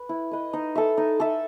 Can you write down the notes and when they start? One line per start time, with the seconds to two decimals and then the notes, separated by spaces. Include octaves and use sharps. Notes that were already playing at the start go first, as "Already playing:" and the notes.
Already playing: B4
0.09 E4
0.31 B4 D#5
0.53 D#4
0.75 A4 E5
0.98 D#4
1.20 A4 E5